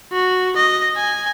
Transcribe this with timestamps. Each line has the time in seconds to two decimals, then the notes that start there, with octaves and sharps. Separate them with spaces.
0.12 F#4
0.57 D#5
0.96 G#5